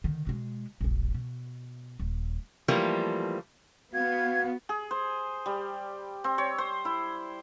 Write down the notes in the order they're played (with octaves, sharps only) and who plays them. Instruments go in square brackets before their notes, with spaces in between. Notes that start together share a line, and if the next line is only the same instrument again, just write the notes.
[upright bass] D3 D#3
B2 G#3
E1 A#1
B2
D#1
[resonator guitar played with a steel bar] E3 F3 G3 A3 A#3
[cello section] B3 [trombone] F#4 [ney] F5 [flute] G#6
[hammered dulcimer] G#4
C5
G3
C4
C#5
C5
E4